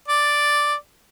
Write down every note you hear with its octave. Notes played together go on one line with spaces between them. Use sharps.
D5